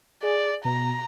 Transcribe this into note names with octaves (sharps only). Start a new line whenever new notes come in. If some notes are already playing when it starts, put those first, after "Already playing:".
G#4 D5
B2 A#5